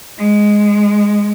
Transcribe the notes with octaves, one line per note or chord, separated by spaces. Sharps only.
G#3